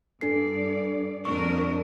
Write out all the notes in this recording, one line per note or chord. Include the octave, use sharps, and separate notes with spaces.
G2 D4 A4 D5 C7
F2 D4 A#4 C#6